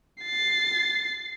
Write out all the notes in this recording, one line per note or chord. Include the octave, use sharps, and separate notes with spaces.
A6 C7